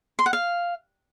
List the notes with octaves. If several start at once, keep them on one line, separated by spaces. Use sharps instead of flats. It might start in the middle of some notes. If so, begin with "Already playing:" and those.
C6
F#5
F5